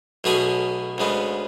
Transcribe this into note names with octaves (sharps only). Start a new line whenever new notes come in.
B1 B2 A3 C#4 G#4
D2 C#3 G#3 B3